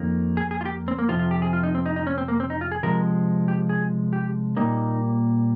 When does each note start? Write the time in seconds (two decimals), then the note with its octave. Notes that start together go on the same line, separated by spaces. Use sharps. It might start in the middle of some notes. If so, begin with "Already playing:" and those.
Already playing: F2 D#3 A#3
0.37 G#4
0.51 G#4
0.61 F4
0.65 G4
0.88 C4
0.99 A#3
1.09 F2 C3 F3 F4
1.19 F4
1.31 G4
1.42 G#4
1.53 F4
1.63 D#4
1.75 C4
1.86 D#4
1.96 D#4
2.07 C#4
2.18 C4
2.28 A#3
2.40 C4
2.50 D#4
2.61 F4
2.72 G#4
2.83 C3 F3 G#3 A#4
3.48 G4
3.69 G#4
4.13 G4
4.57 A#2 G3 A#3 D#4